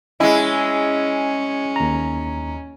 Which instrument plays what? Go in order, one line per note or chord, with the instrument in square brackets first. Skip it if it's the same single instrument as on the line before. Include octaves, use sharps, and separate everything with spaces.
[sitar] G#3 E4 [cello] C#4 [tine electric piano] D#5 G#5
[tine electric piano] D#2 A#5